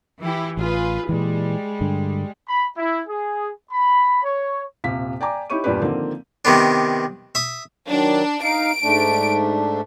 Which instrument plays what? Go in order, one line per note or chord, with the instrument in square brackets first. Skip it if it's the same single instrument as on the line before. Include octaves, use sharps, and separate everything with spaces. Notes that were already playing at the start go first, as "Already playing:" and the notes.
[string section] E3 E4 G4
[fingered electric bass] A1 [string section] F4 G#4 B4
[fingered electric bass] A#2 E3 [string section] G3 G#3
[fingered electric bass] G2 D3
[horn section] B5
E4
G#4
B5
C#5
[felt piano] D#1 C3 F5 B6
D5 G5 G#5 A#5 D6
D#4 E4 G4 C#5 C#6 D#7
E2 G2 A#2 D4 G4 B4
D3 D#3 F3 A#3 C4
[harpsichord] C3 D#3 B3 D4
E5 D#6
[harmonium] D#3 F#3 [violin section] D4
[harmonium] D#4 F5 [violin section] D7
[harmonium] G#2 A3 D4